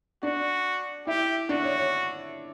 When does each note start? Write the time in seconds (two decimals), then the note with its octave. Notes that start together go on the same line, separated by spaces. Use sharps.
0.23 D4 F#4 D5
1.07 E4 G4 E5
1.49 D4 F#4 D5
1.63 C#5
1.78 C#5